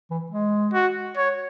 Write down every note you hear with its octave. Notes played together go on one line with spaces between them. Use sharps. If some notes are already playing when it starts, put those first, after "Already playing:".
E3
G#3
F#4
C#5